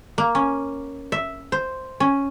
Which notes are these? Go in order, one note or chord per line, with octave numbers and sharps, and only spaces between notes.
A#3
C#4
E5
C5
C#4